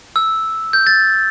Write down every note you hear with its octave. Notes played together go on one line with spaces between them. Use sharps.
E6
G6
A6